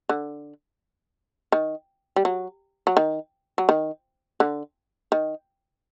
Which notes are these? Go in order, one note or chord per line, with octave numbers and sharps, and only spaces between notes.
D3
D#3
G3
F#3
F#3
D#3
F#3
D#3
D3
D#3